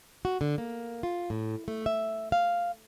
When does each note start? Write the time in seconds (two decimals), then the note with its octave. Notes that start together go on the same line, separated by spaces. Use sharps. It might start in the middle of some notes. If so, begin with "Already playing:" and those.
0.25 F#4
0.41 D3
0.58 A#3
1.03 F4
1.30 A2
1.68 A3
1.86 E5
2.32 F5